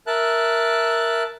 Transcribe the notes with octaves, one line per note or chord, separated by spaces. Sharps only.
A#4 E5 A5 F#6